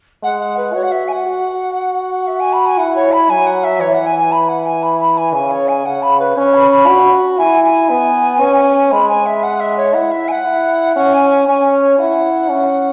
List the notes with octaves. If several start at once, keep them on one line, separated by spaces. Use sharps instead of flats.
G#3 F#5
F#5
B4
F#4 C#5
F#5
E5
G#5
F#5
F#4
E5
G#5
B5
G#5
E4 F#5
C#5
B5
F#3 G#5
F#5
E5
E3 C#5
F#5
G#5
G#5
B5
F#5
G#5
B5
B5
G#5
C#3 G#5
C#5
G#5
C#3 F#5
B5
B4
C#4 C#5
B5
B5
F#4
E4 G#5
G#5
B3
C#4
G#3 B5
G#5
E5
F#5
E5
C#5
E4 F#5
E5
G#5
F#5
E4
C#4 F#5
G#5
G#5
C#4 G#5
C#5
E4 F#5
C#4